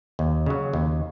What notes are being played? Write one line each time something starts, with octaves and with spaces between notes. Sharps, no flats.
D#2
C#3 F#3
D#2